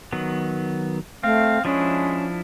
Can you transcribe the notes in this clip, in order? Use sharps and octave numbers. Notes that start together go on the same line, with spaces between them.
D#3 F#3 B3
A3 C4 F5
F3 G#3 C#4 D4 E4